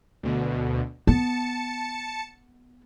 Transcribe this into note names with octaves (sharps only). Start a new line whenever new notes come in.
D2 B2 D3
B3 A5 C#7